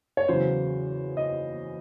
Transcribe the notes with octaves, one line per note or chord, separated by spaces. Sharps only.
C#5
E2 C#3 F#3 C5
D#5